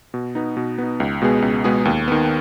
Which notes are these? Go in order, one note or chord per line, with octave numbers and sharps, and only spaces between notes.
B2
B3 D#4
B2
B3 D#4
C#2
B2 G#3 B3 G#4
C#2
B2 G#3 B3 G#4
D#2
D#3 B3